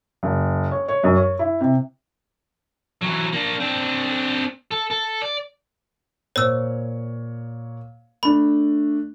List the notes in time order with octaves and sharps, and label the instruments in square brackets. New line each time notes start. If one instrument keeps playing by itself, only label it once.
[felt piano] F#1
C#5
C#5
F#2
C#5
E4
C3
[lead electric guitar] E3 F#3
A#3 D4
C4 D4
A4
A4
D5
[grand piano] A#2 C#5 [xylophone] C5 E6
[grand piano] A3 D4 [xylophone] B5